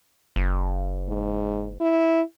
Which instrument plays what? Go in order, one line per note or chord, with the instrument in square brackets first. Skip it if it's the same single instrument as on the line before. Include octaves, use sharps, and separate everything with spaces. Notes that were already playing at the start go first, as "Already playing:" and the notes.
[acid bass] F#1
[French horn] G#2
E4